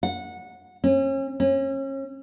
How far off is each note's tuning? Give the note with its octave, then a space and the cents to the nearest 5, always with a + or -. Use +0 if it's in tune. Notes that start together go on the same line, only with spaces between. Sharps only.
F#5 -15
C#4 -40
C#4 -35